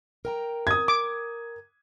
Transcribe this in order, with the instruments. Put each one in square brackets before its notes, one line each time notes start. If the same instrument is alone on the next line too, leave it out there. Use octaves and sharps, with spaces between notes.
[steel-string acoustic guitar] A#4 G5 A#5
[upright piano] D#6 G#6
[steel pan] D6